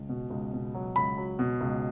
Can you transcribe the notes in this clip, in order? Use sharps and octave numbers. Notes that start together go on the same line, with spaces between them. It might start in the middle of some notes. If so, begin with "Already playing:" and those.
Already playing: C#2
B2
C#2
B2
F#3
C#2 B5
F#3
B2
C#2